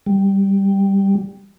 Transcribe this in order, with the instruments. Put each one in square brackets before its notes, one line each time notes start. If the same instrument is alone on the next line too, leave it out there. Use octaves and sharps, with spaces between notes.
[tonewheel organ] G3